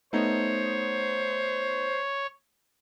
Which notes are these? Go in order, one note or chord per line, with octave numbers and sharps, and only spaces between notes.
A3 B3 D#4 C5 C#5